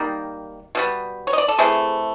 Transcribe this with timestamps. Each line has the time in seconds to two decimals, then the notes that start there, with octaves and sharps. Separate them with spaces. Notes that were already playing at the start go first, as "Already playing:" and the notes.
Already playing: D#3 G3 A#3
0.75 B2 G3 B3
1.27 C#5
1.33 D#5
1.38 D5
1.48 A4
1.59 C3 E3 A3 G#4